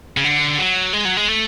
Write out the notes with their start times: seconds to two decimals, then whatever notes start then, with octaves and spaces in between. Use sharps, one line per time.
0.17 C#3
0.24 D3
0.58 F#3
0.93 G#3
1.05 F#3
1.17 G#3
1.28 A3